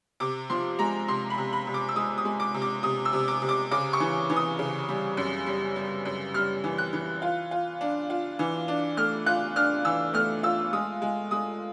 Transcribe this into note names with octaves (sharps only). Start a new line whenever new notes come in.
C3 D6
F3 C6
G#3 A#5
C3 C6
B5
C3
B5
C3
D6
E6
G#3 D#6
D#6
G#3
D6
C3
D6
C3 D#6
E6
C3
D6
C3
D6
C#3 D6
C#6
E3
E3
D#6
C#3
G3
F#2
G3
G3
F#2
G3 F6
E3
F#6
E3
F4
F4
D4
F4
E3
D4
A3 F6
F4 F#6
D4 F6
E3 E6
A3 F6
F4 E6
G#3 D#6
G#3
G#3 D#6